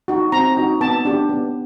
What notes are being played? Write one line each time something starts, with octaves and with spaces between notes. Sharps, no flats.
D#4 F#4
C4 A#5
D#4 F#4
B3 A5
D4 G4
B3